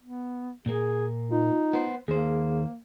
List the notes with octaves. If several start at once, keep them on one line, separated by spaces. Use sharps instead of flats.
B3
A#2 A#3 G#4
D#4 F4
B3 C5
D#2 A#3 G#4 C5